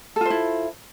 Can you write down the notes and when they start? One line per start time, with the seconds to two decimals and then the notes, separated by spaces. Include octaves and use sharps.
0.16 A4
0.21 F4
0.26 C5
0.30 E4